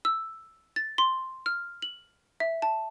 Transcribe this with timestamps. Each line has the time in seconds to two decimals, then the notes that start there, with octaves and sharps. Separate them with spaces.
0.05 E6
0.76 A6
0.98 C6
1.46 F6
1.82 F#7
2.40 E5
2.62 A5